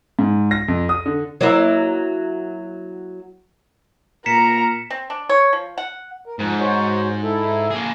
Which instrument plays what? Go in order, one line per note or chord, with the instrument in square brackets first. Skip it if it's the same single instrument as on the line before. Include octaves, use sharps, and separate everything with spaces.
[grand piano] G#2
A#6
F2
D#6
D3
[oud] F#3 A#3 E4
[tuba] A#2 [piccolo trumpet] A#4 [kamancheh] A#5 [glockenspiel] B6 C#7 E7
[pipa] C4
D4
C#5
F3
F#5
[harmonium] A#4
[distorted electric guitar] G#2 [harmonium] F3
[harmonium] F#4 C5 C#5
E4 A4
[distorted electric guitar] A#3 G#4